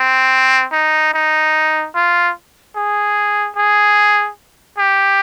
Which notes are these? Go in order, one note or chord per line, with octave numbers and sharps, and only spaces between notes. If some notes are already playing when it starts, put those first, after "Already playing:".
Already playing: C4
D#4
D#4
F4
G#4
G#4
G4